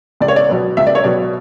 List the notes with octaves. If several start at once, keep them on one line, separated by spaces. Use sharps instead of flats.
C#2 D5
C#5
D5
B2 F#3 B3
C#2 E5
D5
C#5
B2 F#3 B3 D5